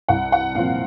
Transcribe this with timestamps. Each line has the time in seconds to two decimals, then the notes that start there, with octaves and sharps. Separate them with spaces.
0.09 C2 F#5
0.32 F#5
0.55 A#2 F3 C4 F5